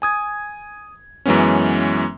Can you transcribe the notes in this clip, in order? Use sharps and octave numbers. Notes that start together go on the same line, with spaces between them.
G#5 D#6 G#6
F#2 E3 G#3 B3 C#4